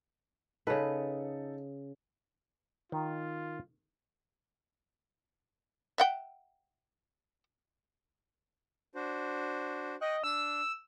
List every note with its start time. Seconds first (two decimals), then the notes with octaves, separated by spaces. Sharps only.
0.67 C#3 D#4 A4 B4
2.92 D#3 F4
5.98 E5 F#5 G5
8.95 D4 F#4 C5
10.01 D#5 G5 C#6 F#6
10.24 D4 E6